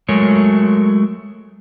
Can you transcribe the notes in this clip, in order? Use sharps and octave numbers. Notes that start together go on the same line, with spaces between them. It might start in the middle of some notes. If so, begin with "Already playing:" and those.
F#3 G#3 A3 A#4 C#5